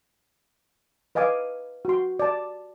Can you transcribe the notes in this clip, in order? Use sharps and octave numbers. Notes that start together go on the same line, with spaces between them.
B4 D#5 F5 G#5 D6
F#4 C6
D5 A5